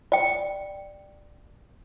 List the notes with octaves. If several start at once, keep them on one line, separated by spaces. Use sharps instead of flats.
D5 G5